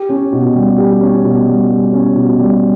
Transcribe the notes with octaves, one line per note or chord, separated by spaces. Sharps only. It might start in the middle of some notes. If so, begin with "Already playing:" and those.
Already playing: G4
C#4
B2
G3
G4
C#4
B2
G3
G4
C#4
B2
G3